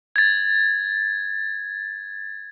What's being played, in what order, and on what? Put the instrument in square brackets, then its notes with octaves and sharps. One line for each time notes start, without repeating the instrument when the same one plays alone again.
[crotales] G#6 A6